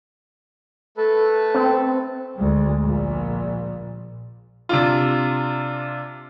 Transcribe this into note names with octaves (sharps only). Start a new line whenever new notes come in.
A3 A4 B4
C4
D2 G#3
A#1 A#2
C3 D4 F4